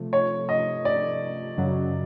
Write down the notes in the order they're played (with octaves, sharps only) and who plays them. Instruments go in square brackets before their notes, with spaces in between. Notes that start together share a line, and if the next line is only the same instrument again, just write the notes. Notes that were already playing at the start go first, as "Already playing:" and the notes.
Already playing: [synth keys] C3 F3 A3
[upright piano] C#5
D#5
D5
[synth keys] F#2 C#3 F#3